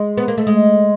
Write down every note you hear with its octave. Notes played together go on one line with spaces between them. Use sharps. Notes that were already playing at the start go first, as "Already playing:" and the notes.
Already playing: G#3
B3
A#3
A3
G#3